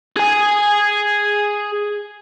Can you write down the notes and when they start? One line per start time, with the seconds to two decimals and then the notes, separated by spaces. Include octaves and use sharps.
0.17 G#4 G#5